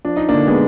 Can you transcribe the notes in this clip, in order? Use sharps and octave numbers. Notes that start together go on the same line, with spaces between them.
F3 D4
D#4
A#3 D4
D3
G#3 B3